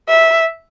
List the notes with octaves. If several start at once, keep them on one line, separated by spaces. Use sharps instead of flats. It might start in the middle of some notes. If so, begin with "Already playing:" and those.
E5